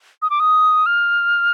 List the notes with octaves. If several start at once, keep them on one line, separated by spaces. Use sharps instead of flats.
D#6
D6
D#6
F6